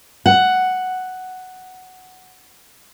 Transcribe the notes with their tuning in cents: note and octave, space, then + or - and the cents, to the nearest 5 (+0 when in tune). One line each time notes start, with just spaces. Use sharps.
F#5 +5